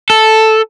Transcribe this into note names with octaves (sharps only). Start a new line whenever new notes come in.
A4